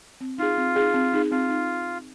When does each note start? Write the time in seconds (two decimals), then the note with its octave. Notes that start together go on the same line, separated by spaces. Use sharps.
0.21 C4
0.38 D#4 F4 G#4
0.58 C4
0.76 D#4 G#4
0.94 C4
1.13 D#4 G#4
1.31 C4 F4
1.50 D#4